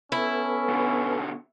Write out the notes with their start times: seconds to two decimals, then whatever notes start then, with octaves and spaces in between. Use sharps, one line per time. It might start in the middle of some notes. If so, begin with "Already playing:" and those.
0.12 B3 C#4 E4 A4
0.69 B2 D3